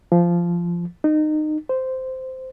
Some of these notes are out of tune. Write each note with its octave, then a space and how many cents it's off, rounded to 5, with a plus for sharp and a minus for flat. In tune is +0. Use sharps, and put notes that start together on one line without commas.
F3 -15
D#4 -25
C5 -10